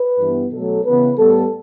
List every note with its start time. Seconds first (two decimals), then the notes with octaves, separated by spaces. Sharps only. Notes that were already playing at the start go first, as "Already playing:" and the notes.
Already playing: B4
0.19 G2 E3 B3
0.52 B2 F#3 A3 A4
0.84 C#3 E3 B3 B4
1.17 A2 G3 B3 A4